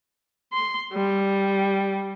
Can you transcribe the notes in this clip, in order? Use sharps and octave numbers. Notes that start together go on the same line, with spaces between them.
C6
G3